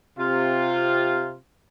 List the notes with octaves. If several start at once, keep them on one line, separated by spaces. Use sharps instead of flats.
C3 F4